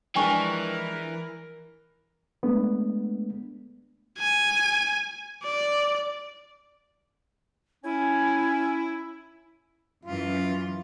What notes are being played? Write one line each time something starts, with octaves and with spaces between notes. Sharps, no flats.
E3 F3 G#3 D4 A#4 G5 G#5 C#6
G#3 A3 B3 D4
G#5
D5
C#4 E4 G#5
F#2 E3 F4